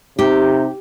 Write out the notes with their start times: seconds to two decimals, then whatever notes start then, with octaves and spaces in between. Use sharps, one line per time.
0.19 C3 D#4 G4